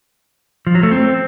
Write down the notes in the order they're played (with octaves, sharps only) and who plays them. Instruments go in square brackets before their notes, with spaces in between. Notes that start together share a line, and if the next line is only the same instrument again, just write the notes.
[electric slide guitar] F3
F#3
A3
C4